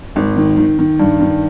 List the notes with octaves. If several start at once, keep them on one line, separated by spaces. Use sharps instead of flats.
G#1
D#3
D#3
D#3
G2
D#3